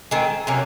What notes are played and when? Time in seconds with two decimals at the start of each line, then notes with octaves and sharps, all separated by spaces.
0.11 D#3 G#3 C4
0.47 C3 F#3 A#3 C#4